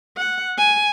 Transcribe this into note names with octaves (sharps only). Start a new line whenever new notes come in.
F#5
G#5